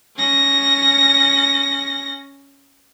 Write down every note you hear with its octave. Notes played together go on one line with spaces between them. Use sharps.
C#4 A#6